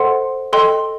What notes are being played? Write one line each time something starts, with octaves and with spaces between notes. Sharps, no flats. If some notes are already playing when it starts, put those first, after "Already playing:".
Already playing: A4 C5 D#5 F#5 C6
A4 D#5 G5 C6